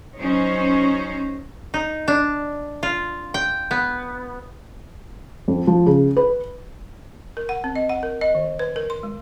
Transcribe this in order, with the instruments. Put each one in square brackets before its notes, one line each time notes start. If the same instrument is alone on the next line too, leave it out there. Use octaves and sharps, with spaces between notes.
[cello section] F#3 C#4 D#4 C5 C#5
[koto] D#4
D4
F4
G5
B3
[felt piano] F2
F3
C#3
B4
[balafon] A#4
F#5
C4
D#5
F#5
A#4
D#5
D#3
B4
A#4
C6
G#3